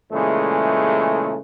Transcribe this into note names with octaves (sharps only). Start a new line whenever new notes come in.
A#2 C#3 E3 G#3 A3